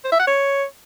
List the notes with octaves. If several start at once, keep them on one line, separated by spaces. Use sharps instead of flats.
C5
E5
F#5
C#5